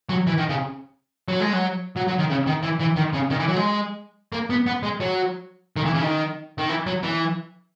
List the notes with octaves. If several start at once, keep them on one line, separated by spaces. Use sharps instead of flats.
F#3
E3
D#3
C#3
F#3
G#3
F#3
F#3
F#3
D#3
C#3
D#3
E3
E3
D#3
C#3
D#3
E3
F#3
G#3
A#3
B3
B3
G#3
F#3
D#3
E3
C#3
D#3
D#3
E3
F#3
E3